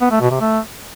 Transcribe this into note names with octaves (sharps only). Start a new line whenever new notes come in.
B3
A3
B2
C3
A3